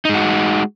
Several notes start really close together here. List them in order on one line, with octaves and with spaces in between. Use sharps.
D#4 G#3 F#4